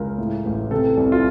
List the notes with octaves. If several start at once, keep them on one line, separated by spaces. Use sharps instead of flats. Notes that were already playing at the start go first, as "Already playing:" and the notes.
Already playing: C#2 A#4
A2
A1
C3 A4
C2
F4